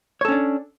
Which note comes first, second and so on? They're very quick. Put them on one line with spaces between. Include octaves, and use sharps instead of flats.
C#5 A4 C#4 D4